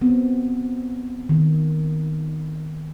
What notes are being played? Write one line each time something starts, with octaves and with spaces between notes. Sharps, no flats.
B3 C4
D#3